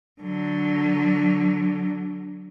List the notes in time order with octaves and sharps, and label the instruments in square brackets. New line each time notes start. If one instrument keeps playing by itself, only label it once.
[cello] D3 F#3